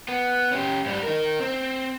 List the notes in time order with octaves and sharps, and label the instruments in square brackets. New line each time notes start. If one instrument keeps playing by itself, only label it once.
[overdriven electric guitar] B3
C#4 G4
G#2 G3
D#4 A#4
C4